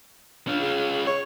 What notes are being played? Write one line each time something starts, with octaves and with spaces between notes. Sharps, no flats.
C#4 D4 F4
G#4
C#5